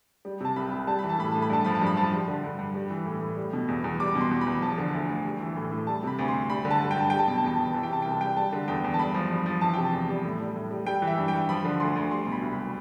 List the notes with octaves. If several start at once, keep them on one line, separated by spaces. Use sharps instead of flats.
G3
C3 A5
C2 B5
C2
G3 A5
E3 B5
A5
A2 B5
A2 A5
B5
G2 A5
F3 B5
A5
G2
B5
F3 A5
G3
D3
G2
G2
G3
E3
A2
A2
G3
B2
E2
E2
G3 D6
B2
C6
E2
B5
E2
F3 A5
D3
D2
D2
G3
E3
A2
A2
G3 A5
C3 B5
D2
C6
D2
G3 B5
D3
A5
G2
G5
G2 A5
G3 G5
A5
B2 G5
A5
E2 G5
E2 A5
G5
E3 A5
G5
C3 A5
C2 G5
A5
G3 G5
G3 A5
D3
E2 G5
E2
A5
G2 B5
F3
G2
F3
E3 A5
C3 G5
A5
E2
G3
A2
G3
A2
G3
G3 G5
E3
E5
G2
G2 G5
F3 B5
D3
D2 C6
D2
G3 C6
B2
B5
C2
B5